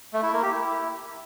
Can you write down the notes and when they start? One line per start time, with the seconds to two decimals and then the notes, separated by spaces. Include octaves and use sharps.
0.13 A3
0.23 E4
0.33 A#3
0.42 G4
0.52 E4